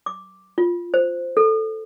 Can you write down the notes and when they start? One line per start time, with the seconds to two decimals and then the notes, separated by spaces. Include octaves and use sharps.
0.06 D6
0.58 F4
0.94 C5
1.37 A4